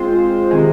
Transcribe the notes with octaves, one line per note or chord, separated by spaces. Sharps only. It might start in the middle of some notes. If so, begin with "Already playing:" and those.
Already playing: G#3 C4 F4 C5
C3 D#3 G#3